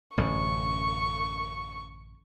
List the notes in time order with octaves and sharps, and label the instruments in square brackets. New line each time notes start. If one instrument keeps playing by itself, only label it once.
[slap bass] A1 F#2 D3 [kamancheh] C#6